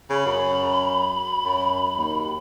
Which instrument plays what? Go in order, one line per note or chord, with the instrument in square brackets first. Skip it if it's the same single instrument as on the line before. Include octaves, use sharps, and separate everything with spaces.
[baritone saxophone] C#3 [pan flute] B5
[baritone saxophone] F#2
F#2
D#2